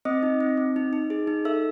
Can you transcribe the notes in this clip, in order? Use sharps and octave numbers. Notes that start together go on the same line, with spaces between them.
C4 D#5 D#6
D#4
C4
C4
D#4
D#4
G#4
D#4
A4 E5 E6